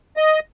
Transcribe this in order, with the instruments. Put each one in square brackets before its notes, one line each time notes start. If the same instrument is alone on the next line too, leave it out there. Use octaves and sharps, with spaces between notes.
[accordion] D#5